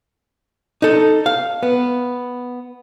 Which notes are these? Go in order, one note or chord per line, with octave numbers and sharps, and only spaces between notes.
D#4 A4
F5
B3